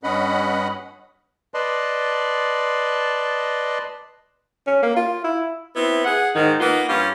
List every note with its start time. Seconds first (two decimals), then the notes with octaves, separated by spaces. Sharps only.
0.03 G2 C#4 D#5 F#5 B5
1.54 B4 D5 D#5 A5 C6
4.67 C#4
4.83 A#3
4.96 F4
5.24 E4
5.76 B3 C4 E4
6.05 G#4 F#5
6.35 G#2 D#3
6.60 A#3 B3 D#4 F4
6.89 G2 C#4 F4